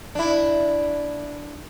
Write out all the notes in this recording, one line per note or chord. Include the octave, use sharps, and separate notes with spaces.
D4 E4